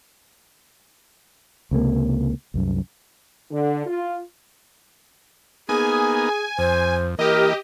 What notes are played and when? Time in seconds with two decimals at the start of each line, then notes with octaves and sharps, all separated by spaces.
1.71 C#2 C3 D#3 A#3
2.54 C2 F#2
3.51 D3
3.85 F4
5.69 A#3 B3 D#4 G#4 G#5
6.58 F2 C5
7.19 E3 A#3 G4 A#4 D#5